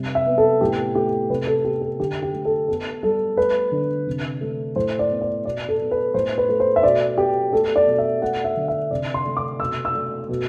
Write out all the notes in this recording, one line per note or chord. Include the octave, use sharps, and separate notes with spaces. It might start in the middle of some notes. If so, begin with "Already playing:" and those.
Already playing: C3 G3
E5
B3
A4
A2 G4
A3 G4
C3 B4
A4
B3 G4
A4
D3 G4
G4
A3
A4
B3 A4
G3 A4
A3 B4
D3
C3
A3
A2 C5
D5
B3
D5
B2 D5
A4
B3
B4
A2 C5
B4
A3
C5
E5
B2 D5
B3 G4
A3 A4
D5
B2
E5
A3 F#5
E5
D3
E5
C3 D5
C6
A3
D6
B2 E6
E6
A3
B2